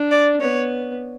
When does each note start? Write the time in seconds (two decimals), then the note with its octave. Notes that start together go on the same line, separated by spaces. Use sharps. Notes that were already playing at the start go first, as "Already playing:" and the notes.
Already playing: D4
0.11 D5
0.41 B3 C#5